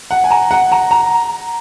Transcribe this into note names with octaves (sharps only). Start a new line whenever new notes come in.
F#5
G#5
A#5
F#5
A#5
A#5